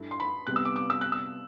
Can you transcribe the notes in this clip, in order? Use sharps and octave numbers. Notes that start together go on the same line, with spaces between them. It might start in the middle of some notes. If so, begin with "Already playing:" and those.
Already playing: G2 A3 E4
C6
B5
C3 G3 B3 F#6
E6
D6
D6
E6
F#6
E6